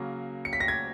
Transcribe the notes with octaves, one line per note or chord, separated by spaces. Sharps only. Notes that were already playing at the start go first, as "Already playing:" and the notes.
Already playing: C#3 F#3 A#3
C#7
B6
A#6
G#6